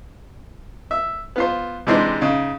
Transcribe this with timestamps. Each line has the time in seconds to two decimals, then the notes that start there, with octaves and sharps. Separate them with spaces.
0.91 E5
1.36 B3 F4 C5
1.87 C3 E3 G#3 D4 D#4 C5
2.21 C#3 D#4